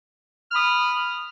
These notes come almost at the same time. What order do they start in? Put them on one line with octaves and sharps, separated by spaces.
F6 B5 D#6